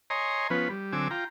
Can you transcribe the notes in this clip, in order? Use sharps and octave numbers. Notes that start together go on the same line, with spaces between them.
C#5 D#5 G#5 A#5 C6
F3 B3 C#4 B4
G3
D3 F#3 C4 G#5 D6 E6
F4 G5 A#5